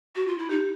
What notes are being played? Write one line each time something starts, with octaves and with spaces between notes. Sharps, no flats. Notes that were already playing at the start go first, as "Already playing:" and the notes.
F#4
F4
E4
D#4 G4